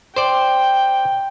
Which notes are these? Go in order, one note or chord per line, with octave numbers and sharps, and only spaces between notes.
C5 D5 G5